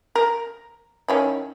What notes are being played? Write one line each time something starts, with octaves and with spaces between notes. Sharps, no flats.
A#4
D#3 C#4 E4